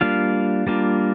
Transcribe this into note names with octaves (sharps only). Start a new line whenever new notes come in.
G3 A#3 D4 F4 F5
G3 A#3 D4 F4